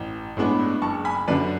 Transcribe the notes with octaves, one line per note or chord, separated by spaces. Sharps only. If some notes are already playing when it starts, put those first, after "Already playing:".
Already playing: A1
A2 G#3 B3 D4
F#1 A5 C#6
G#5 B5
F#2 D3 B4 D5